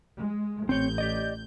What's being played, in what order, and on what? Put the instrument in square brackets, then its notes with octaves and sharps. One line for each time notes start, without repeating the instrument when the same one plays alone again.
[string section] G#3
[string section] A1 G6 [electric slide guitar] C4 C#5
[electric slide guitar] G4 D5 D#5